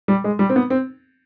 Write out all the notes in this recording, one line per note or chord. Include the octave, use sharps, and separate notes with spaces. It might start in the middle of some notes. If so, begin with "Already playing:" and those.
G3
G#3
G3
C4
B3
C4